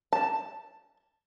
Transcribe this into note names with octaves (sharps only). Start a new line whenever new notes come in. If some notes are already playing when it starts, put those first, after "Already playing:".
A5